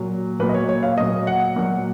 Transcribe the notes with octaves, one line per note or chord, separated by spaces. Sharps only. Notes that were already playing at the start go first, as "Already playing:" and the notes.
Already playing: A#2 F#3
A#2 F#3 B4
D#5
C#5
C#5
F5
A#2 F#3 D#5
F#5
A#2 F#3